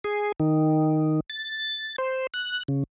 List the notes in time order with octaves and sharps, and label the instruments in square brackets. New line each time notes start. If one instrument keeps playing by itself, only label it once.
[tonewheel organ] G#4
D#3
A6
C5
F#6
C#3